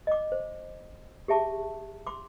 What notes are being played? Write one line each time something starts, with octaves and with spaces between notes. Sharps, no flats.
D#5 D6
C5
G4 G#4 E5 A5 C#6
C6 D6